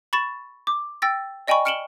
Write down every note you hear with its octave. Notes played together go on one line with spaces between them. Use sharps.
B5 C#6 A6 E7
D6
G5 E6 A6 A#6
D5 D#5 G5 G#5 B5 C#6
F6 C#7 D7 E7 F#7 G7